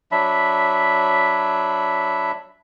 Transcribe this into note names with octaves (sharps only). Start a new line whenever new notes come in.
F#3 D4 E5 B5